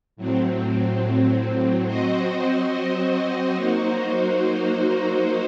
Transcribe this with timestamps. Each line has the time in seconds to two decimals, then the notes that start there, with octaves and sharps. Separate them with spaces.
0.17 A2 F#3 C4
1.86 F#3 C4 F#4 C5 D#5
3.55 F#3 A#3 D#4 F#4 C5